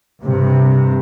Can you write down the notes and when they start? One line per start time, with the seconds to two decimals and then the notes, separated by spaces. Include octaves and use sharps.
0.21 G2 C3